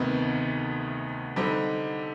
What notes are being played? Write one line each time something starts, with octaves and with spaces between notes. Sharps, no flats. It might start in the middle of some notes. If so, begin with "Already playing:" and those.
Already playing: D2 C3 D#3 B3 D#4
D3 G3 C4 D#4